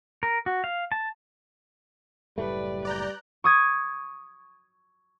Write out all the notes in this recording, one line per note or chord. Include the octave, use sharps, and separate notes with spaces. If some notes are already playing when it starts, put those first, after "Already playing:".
A#4
F#4
F5
A5
F#1 A2 G3 A3 B4 D5
D5 A#5 F#6 G6
C#6 D#6 G#6